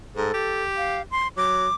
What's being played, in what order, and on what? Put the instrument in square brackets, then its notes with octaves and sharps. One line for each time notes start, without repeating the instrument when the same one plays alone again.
[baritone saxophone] G#2 [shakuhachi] A4
[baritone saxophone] G4
[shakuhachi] F5
C6
[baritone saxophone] F#3 [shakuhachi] D6